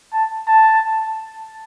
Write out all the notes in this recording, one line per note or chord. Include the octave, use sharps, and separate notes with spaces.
A5
A5